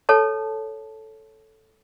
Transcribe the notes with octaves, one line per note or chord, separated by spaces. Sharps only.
A4 C#5 A5